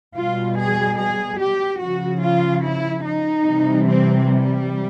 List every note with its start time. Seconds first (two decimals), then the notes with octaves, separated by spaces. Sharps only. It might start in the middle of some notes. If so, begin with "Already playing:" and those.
0.17 B2 G3 F4
0.59 G#4
0.99 G#4
1.40 G4
1.81 C#3 F3 F#4
2.22 F4
2.63 E4
3.05 D#4
3.45 C3 E3 G3
3.86 C4
4.27 G3